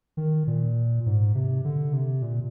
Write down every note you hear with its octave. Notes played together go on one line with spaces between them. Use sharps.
D#3
A#2
G#2
C3
D3
C3
A#2